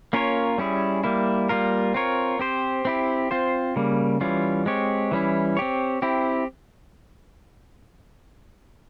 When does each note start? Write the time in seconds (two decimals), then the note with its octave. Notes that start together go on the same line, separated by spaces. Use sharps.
0.13 A#3 C#4 F4 A#4 C#5
0.58 G3 C#4 E4 G#4
1.04 G3 A#3 E4
1.49 G3 A#3 F4 A#4
1.94 C4 F4 A#4 C#5
2.39 C4 G4 C5
2.85 C4 E4 G4
3.31 C4 F4 C5
3.76 C#3 G3 A#3
4.21 E3 G3 C#4 F4
4.66 G#3 C4 G4 C#5
5.11 E3 G3 C#4 E4
5.57 C4 G4 C#5
6.02 C4 E4 G4